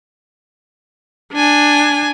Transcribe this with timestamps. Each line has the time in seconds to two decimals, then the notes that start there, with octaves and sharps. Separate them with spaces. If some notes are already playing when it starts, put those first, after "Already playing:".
1.33 D4 G#5